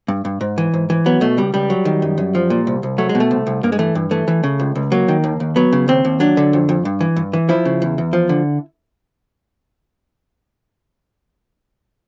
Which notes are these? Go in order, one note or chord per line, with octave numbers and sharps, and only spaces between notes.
G2
G2
G#2
E3
G#2
E3
F#3 B3
B2 A3
C#2 G3
C#2 G3
F#3
D#3
F#2
F#2
F3
A#2
C2
C2
F#3 A3
G#3
B2
A3
C2
C2
G2 A#3
G#3
E3 A3
G2
E3 A3
E3
C#3
C#2
C#2
F#3 A#3
D#3
D#2
D#2
F#3 B3
C#3
D#2 C4
D#2
F#3 D4
D3
F2
F2
G2
E3
G2
E3
F3 E4
C#3
E2
E2
F3
D3